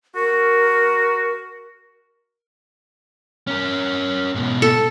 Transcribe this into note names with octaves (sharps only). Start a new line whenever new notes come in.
F#4 A#4
C#4 A#4
G#2 B2
A4